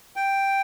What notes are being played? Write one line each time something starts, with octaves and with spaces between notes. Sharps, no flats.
G5